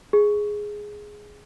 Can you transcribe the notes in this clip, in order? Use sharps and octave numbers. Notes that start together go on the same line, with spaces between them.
G#4